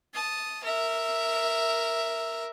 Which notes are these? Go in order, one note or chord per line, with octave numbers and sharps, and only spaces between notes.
A5 D#6
A#4 E5